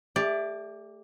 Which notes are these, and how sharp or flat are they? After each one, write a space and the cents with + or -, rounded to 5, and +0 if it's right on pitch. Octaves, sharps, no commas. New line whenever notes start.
A3 +0 G4 +35 D5 +0